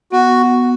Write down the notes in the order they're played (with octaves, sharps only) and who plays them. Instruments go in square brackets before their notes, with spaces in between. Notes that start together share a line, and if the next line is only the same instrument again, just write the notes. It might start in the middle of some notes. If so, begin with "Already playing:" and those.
[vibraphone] B3 [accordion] F#4